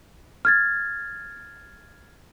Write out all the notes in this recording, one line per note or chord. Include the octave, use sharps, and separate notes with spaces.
F6 G#6 A6